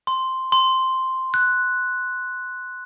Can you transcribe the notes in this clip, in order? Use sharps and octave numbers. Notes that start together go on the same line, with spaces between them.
C6
C6
F#6